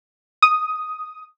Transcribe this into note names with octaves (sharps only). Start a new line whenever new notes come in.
D#6